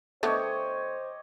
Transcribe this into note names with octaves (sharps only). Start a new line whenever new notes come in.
D3 A3 B3 G4 C5 C#5 D#5